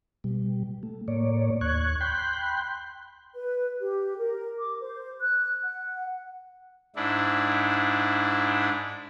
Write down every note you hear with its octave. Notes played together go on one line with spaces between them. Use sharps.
B2 G3
A3
A2 A#3 C#5 D5
D#2 C#6 F#6 G#6
G5 B5 C6 F#6 G6
B4
G4
A#4
D6
C5
F#6
F#5
G#2 D4 E4